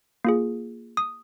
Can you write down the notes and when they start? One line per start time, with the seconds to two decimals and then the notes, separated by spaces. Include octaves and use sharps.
0.24 A#3 F4 G#4
0.97 D#6